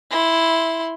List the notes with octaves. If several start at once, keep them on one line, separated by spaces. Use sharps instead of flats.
E4 C6